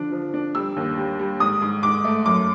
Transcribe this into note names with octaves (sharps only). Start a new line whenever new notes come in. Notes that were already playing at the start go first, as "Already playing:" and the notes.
Already playing: D3 F3 D4
F3
D4
G3 E6
D#2
G3
G3
G#2 D#6
G#2
G#2 D6
A3
F#2 D6